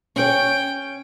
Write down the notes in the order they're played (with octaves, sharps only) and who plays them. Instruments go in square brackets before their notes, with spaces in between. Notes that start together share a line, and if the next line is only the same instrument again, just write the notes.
[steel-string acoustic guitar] C#4 C#5 [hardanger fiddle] G5